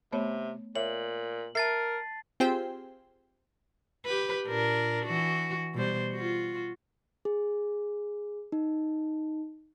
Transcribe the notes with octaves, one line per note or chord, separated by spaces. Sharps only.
C3 A3 B3 C#5
A#2 C#5 E5 F#7
A#4 E5 A5 A6 C7
C4 F4 G4 G#4 C5 G5
G4 B4
A#2 D4 A#4
E3 F#4
B2 G3 C5
F4 F#4
G#4
D#4